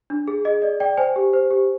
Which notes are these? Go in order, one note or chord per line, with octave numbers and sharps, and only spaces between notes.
D4
G#4
G#4 D#5
D5 D#5
D5 G5
C5 G#5
G4
C5
G4